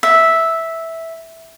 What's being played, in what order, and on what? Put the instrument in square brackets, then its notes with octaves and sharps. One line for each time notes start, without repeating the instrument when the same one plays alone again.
[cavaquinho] E5